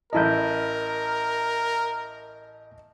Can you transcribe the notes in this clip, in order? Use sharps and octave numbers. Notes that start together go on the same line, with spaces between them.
A1 E4 A#4 D#5 A5 A#5 G6